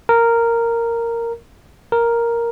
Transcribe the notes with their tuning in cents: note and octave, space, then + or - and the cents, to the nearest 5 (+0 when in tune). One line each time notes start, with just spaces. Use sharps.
A#4 -10
A#4 +0